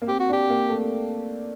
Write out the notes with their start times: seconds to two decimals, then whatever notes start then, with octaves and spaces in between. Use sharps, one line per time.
0.02 A#3
0.08 C4 G4
0.20 F#4
0.29 D4
0.33 G4
0.50 A#3
0.70 A3